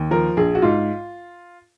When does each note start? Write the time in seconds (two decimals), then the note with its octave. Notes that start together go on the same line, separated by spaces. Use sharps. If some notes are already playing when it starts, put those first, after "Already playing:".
Already playing: D#2
0.11 F3 A#4
0.37 A#1 G#4
0.55 F#4
0.62 G#2 F4